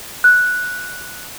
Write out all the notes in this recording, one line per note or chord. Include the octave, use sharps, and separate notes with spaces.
F#6